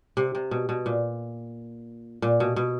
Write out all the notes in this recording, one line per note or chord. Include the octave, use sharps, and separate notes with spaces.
C3
C3
B2
B2
A#2
A#2
B2
B2